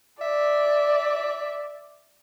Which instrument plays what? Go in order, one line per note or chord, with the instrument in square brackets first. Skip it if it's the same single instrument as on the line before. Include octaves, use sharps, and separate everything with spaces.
[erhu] D5 [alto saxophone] E5